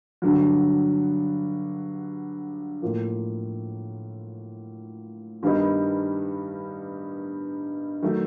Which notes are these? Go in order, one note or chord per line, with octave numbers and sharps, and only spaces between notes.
G2 D3 F#3
A2 F3 A#3
G2 D#3 G3 B3 D#4
D#3 F#3 A3